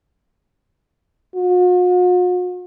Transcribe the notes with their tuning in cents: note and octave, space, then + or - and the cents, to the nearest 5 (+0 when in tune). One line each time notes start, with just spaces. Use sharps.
F#4 -45